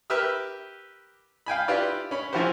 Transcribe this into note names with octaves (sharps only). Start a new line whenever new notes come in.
G4 A#4 B4 E5 E6 F6
F5 G5 G#5 B5
E4 F4 G4 B4 D5
C#4 B5
E3 F3 E4 F#4 G4 C5